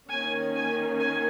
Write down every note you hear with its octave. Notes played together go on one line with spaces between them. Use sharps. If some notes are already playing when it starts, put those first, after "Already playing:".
D#3 A#3 C#4 G#5
G#5
G#5